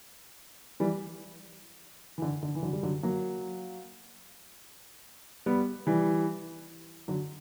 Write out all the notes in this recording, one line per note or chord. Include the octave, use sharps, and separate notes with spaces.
E3 G3
E3
D3
D3
E3
D3 F#3
G3
D3 F#3
F#3 A#3
G3 B3
E3 G3
D3 F#3